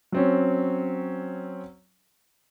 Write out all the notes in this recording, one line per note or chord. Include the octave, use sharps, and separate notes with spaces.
F#3 C4 C#4